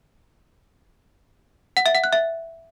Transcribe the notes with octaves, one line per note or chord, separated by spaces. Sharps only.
F#5
E5
F#5
F#6
E5